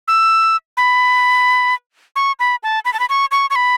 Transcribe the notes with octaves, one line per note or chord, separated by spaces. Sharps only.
E6
B5
C#6
B5
A5
B5
A5
B5
C#6
C#6
C#6
B5